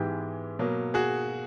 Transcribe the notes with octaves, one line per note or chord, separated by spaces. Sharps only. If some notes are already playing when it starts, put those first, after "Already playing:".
Already playing: G#2 E3 G#3 B3 G4
B2 F#3 A#3
F#4 G#4